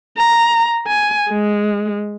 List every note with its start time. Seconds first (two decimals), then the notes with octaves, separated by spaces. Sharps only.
0.17 A#5
0.87 G#5
1.29 G#3